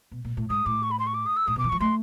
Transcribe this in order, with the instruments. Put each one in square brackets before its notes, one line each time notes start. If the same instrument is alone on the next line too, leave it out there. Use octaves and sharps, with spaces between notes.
[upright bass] B2
A#2
A2
[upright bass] G#2 [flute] D#6
[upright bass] A2 [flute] D6
[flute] C#6
B5
C6
C#6
D6
D#6
E6
[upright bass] A2 [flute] D#6
[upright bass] B2
[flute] D6
[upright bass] E3
[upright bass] F3 [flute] C#6
[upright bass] A3 [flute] C6